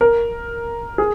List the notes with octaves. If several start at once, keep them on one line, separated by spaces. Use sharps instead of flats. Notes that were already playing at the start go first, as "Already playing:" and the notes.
A#4
G#4